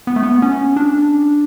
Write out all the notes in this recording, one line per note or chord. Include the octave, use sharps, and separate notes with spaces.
B3
A3
B3
C#4
D4